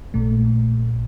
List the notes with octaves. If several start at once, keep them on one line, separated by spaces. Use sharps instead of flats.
A#1 A#2 A3